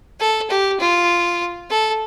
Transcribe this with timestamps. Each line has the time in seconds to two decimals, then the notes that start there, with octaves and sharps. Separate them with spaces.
0.20 A4
0.50 G4
0.80 F4
1.70 A4